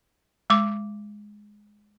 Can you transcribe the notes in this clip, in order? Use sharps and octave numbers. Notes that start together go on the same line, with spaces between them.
G#3 D6